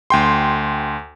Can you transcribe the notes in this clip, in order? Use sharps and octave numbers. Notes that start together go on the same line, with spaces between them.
D2 G5 C6